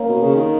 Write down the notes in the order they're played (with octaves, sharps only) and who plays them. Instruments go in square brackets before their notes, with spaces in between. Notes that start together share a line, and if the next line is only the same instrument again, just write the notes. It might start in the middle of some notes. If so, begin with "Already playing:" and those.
Already playing: [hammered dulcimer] A#3 C#4 D#4
[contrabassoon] B2
C#3
D#3